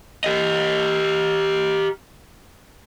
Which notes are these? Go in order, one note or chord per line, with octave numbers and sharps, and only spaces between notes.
G4 D#5